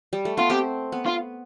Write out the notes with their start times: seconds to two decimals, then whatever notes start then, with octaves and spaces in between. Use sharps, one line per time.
0.13 G3
0.25 A3
0.37 B3 F4
0.50 C4 G4
0.92 B3
1.06 F4